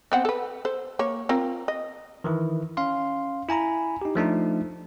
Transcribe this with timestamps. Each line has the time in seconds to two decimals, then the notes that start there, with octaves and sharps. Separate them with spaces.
0.12 B3 C4 F#5
0.25 A4 B4
0.65 A4 C5
0.99 A#3 C#5
1.29 C4 F4 A#4
1.68 D#5
2.24 D#3 E3 E4
2.77 C#4 F5 C6
3.49 E4 G#5 A#5 B5
4.02 D#4 G4
4.15 F3 A3 D4 D#4